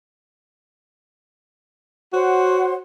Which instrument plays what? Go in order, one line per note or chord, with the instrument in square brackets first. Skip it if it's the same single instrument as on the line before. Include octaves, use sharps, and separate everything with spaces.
[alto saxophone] F#4 [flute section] C5 C#5 F#5